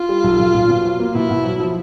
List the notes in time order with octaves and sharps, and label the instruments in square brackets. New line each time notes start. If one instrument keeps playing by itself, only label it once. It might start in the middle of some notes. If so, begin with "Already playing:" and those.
Already playing: [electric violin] F4
[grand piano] G3
B1
B1
A#2
B2
F#3
A#3
[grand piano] B2 [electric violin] E4
[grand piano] B2
F#3
F3